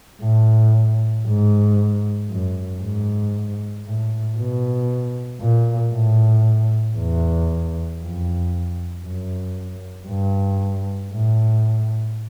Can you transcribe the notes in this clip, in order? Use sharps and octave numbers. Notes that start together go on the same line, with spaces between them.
A2
G#2
F#2
G#2
A2
B2
A#2
A2
E2
F2
F#2
G2
A2